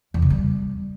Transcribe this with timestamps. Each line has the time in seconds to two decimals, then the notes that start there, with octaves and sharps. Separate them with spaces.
0.14 E2
0.22 C#3
0.30 G3